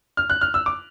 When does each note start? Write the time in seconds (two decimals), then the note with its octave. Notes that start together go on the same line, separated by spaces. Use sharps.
0.17 F6
0.30 F#6
0.41 F6
0.54 E6
0.66 D6